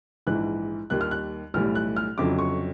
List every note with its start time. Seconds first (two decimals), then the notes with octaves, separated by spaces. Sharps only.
0.27 A#1 G#2 E3 F#6
0.90 D#2 D#3 G3 F#6
1.01 F6
1.11 F#6
1.54 B1 A2 E3 G3 F6
1.75 F#6
1.96 F6
2.18 G1 F2 C#3 F#3 D6
2.39 C#6